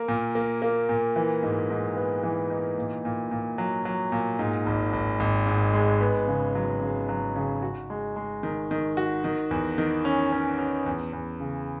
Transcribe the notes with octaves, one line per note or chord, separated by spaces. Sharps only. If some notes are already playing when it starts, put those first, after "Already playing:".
Already playing: A#3 A#4
A#2
A#3
A#3
A#2
E3
G#2
G#2
B3
E3
D#4
A#2
A#2
A#2
F#3
F#3
A#2
G#2
G#1
G#1
G#1
G#2
G#3
B3
C#3
F#3
C#3
F#3
C#3
F#4
G#3
G#3
D#3
D#3
F#4
D#3
E2
D#3
C#4
C#4
C#4
E2
E2
C#3